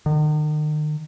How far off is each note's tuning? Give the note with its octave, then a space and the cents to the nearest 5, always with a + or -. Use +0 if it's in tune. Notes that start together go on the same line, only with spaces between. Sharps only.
D#3 -40